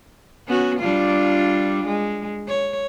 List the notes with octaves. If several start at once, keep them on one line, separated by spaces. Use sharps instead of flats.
B3 C#4 F#4
G3 D4 F4
G#3
C#5